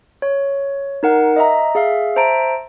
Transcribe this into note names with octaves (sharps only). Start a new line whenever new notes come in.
C#5
D#4 A#4 F#5
D#5 E5 A#5
G#4 E5 F5
C5 E5 A5 A#5 D7